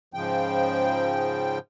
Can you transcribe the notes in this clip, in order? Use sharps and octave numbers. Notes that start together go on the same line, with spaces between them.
G#2 C#3 F3 G5